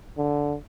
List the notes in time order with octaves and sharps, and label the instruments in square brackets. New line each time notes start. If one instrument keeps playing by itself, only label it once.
[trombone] D3